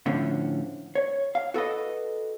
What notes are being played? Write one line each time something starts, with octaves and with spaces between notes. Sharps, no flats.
A2 D3 F3 C#4
C#5
F5
F#4 A4 B4 D#5